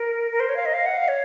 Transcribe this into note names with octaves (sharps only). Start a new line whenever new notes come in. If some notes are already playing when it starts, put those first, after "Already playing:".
Already playing: A#4
A#4
C5
C#5
F5
D#5
F5
F#5
F5
C#5